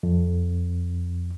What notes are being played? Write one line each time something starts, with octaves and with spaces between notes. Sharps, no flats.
F2